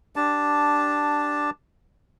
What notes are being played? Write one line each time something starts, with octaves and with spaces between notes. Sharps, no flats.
D4 G4 A5